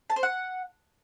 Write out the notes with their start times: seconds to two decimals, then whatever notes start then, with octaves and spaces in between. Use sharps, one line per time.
0.10 A5
0.16 C5
0.23 F#5